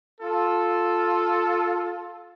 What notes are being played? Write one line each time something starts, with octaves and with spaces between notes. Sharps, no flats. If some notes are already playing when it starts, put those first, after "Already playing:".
F4 A4